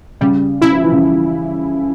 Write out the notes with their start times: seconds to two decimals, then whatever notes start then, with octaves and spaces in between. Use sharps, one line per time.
0.21 C#3 G3
0.62 C#3 E4
0.72 F3
0.82 E3
0.92 C#3